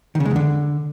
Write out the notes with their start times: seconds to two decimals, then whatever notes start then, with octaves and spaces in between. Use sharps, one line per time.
0.15 D#3
0.20 C#3
0.25 G#3
0.31 E2
0.36 D3